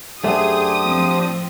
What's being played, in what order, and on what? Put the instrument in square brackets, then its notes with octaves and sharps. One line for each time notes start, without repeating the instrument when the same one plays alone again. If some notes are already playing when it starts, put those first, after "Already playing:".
[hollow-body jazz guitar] F#2 A3 [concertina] D4 G4 C5 [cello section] G#4 [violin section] D#6
[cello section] A2 F3 C4